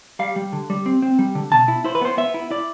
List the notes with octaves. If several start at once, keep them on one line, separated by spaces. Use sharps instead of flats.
G3 F5
G3
D3
G3
C4
C4
G3
D3
B2 A5
E4
E4 C5
B4
B3 C5
B3 E5
E4
E4 D5